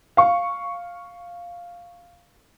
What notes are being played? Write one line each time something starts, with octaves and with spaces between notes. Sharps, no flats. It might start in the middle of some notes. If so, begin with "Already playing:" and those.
F5 C#6